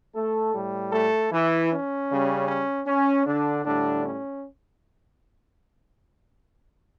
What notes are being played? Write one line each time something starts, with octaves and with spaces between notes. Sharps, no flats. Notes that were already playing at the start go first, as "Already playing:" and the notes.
A3 A4
A2 G3
A3 A4
E3 E4
C#4
C#3 G3
C#4
C#4
D3 D4
A2 D3 G3 D4
C#4